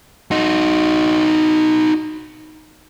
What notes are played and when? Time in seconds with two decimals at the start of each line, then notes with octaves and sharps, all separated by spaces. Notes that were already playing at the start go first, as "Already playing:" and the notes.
0.31 D#4 F#4